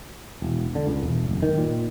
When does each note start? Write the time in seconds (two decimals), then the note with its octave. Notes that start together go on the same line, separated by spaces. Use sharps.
0.42 E1
0.75 D3
0.87 C#2
1.03 E1
1.29 F#1
1.42 D#3
1.58 A#2